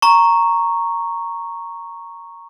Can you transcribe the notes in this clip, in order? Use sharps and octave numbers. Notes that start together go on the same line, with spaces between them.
A#5 C#6